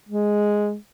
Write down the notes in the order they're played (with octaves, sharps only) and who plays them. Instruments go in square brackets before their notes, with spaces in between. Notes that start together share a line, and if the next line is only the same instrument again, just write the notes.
[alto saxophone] G#3